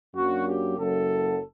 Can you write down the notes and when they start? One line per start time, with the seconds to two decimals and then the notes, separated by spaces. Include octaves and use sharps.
0.14 F#2 F#3 A#3 D4 F#4
0.46 G4
0.77 F#1 F#2 F#3 A4